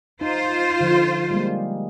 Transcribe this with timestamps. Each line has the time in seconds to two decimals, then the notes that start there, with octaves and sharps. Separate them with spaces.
0.21 D#4 F4 C5
0.80 D3 F3
1.31 G3 G#3 A#3